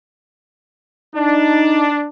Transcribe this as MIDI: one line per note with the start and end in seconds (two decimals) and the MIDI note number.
1.16 2.08 62
1.16 1.87 63